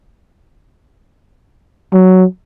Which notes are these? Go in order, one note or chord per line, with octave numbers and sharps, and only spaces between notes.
F#3